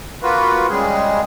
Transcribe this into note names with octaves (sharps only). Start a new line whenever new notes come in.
A#3 F4 F#4 B4
C#3 G3 G#3 G#4